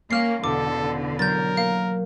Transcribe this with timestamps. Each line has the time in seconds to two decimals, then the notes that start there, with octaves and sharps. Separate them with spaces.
0.11 A#3 C#4 F5 F6 C7
0.44 E2 B2 D3 B3 A4 D6
1.19 F#3 A#4 G6 A6
1.57 A#3 F5